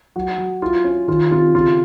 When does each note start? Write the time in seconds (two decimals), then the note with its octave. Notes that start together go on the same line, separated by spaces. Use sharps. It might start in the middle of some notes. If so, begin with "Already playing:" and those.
0.16 F#3 F#4
0.38 F#3
0.62 E4 F4
0.84 C#4
1.08 D#3 F4
1.31 C3 F4
1.54 C#3 F4